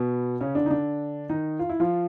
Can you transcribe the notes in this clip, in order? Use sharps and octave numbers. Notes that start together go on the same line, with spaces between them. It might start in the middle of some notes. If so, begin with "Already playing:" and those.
Already playing: B2 B3
C#3 C#4
D3 D4
D#4
D3 D4
D#3 D#4
F4
E4
F3 F4